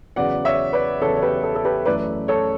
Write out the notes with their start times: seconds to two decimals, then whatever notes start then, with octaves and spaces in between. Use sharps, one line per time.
0.16 E2 C#3 F#3 B3 D5 F#5
0.45 C#5 E5
0.73 B4 D5
1.01 E2 C#3 F#3 B3 A4 C#5
1.16 C#5
1.22 G4 B4
1.43 A4
1.55 A4
1.65 G4 B4
1.86 F#2 E3 A3 B4 D5
2.28 A4 C#5